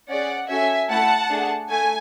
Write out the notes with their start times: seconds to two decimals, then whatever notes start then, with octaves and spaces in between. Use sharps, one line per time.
0.09 C#4 G#4 D5 F#5
0.49 C#4 F#4 A4 E5 G#5
0.90 A3 E4 A4 F#5 A5
1.30 A3 D4 G#4
1.70 A3 G#5